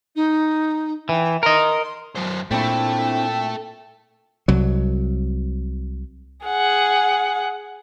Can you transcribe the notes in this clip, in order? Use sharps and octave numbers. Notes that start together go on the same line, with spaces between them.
D#4
E3 G5
A#4 D#5 C6
F#2 C5
A#2 A3 C4 D4 E4 G5
C2 F#3
G#4 F#5